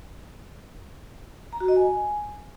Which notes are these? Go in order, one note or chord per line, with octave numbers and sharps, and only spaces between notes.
A#5
F#4
D#5
G#5